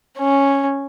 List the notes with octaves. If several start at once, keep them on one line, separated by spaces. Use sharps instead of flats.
C#4